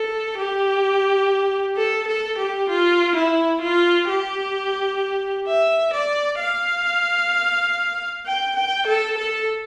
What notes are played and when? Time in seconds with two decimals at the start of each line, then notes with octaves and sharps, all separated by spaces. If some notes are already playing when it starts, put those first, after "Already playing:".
Already playing: A4
0.37 G4
1.77 A4
2.08 A4
2.38 G4
2.69 F4
3.16 E4
3.61 F4
4.09 G4
5.47 E5
5.94 D5
6.40 F5
8.26 G5
8.56 G5
8.87 A4
9.18 A4